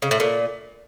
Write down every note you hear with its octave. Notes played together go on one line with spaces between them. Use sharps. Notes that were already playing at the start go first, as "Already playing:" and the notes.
C#3
A2
A#2